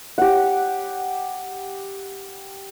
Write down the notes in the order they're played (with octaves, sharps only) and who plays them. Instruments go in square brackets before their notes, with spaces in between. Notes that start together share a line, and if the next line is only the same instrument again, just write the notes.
[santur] G4 F#5